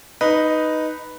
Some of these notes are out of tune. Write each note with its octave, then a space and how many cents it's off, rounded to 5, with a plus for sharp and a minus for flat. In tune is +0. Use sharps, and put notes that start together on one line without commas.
D#4 +0 B4 +0